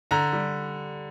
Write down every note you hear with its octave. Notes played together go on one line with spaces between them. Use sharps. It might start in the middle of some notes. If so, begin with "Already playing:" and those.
D3 A#5
G3